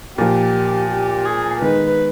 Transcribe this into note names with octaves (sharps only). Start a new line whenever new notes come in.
A#2 F3 A#3 G4
G4
G#4
D#3 G#3 B3 D#4 B4